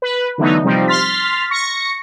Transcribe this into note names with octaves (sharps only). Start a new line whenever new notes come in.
B4
D3 E3 F#3 A3 B3 D#4
C3 F3 G3 C4 D#4
C6 F6 A6 B6
C#6 A#6 C#7